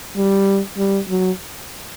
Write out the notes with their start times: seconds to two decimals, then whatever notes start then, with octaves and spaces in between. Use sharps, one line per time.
0.17 G3
0.78 G3
1.09 F#3